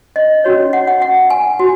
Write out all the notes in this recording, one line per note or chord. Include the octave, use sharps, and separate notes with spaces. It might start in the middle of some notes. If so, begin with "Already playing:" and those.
D#5
C#4 F#4 C#5
F#5
F#5
F#5
G#5
F#4